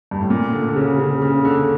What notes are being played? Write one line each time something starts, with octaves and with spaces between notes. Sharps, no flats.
G2
A2
A#2
D3
D3
C#3
C#3
C#3
D3